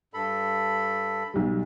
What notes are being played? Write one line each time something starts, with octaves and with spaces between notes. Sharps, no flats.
G2 A4 B5
B1 G3